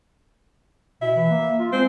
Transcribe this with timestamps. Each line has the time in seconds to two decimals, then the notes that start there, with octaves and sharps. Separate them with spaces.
1.02 B2 E5
1.16 E3
1.30 A#3
1.59 F4
1.72 G#3 C4